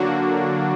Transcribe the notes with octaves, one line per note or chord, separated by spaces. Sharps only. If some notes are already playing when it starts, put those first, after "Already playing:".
Already playing: D3 F#3 A#3 D4 F#4